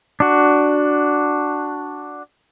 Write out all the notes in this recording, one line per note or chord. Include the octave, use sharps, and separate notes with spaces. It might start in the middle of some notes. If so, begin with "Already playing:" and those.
D4 F#4